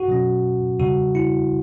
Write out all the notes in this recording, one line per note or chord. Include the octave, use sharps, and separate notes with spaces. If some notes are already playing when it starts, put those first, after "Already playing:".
Already playing: F#4
B2 F#3 C#4
E2 C#3 G3 F#4
E4